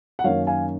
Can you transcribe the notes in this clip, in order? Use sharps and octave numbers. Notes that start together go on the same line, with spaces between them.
F#5
F#2 D#3 A#3 C#4 C#5 F5
F5 G#5